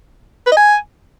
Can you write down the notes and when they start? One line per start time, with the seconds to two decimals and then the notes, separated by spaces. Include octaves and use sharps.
0.46 B4
0.51 D#5
0.57 G#5